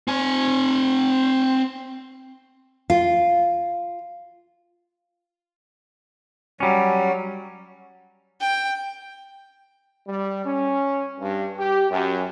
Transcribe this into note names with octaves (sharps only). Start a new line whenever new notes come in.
C4 G#5
F4
F#3 G3 C#4
G5
G3
C#4
G2
G4
F#2